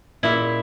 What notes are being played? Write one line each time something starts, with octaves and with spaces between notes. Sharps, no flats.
A#2 E4